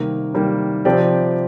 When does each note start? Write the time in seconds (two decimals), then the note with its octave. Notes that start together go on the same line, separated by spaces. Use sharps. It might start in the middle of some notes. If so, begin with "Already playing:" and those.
Already playing: C3 D#3 G3 A#3
0.34 C3 D#3 G3 A#3
0.85 C3 F3 C4 G4 D5